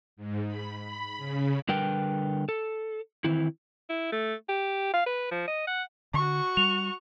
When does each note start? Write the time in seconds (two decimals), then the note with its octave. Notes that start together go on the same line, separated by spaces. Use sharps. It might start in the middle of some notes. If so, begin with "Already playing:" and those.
0.16 G#2
0.46 B5
0.79 B5
1.17 C#3
1.69 D3 G3 A#4 B4 G5
2.49 A4
3.24 D#3 E3 C4 E4
3.89 E4
4.12 A3
4.49 G4
4.93 F5
5.06 B4
5.31 F3
5.48 D#5
5.67 F#5
6.14 D3 F#4 C#6
6.57 G3 F7